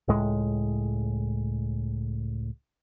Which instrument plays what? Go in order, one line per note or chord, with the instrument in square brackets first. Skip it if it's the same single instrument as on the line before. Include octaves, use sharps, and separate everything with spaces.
[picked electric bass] C#2 A2 G#3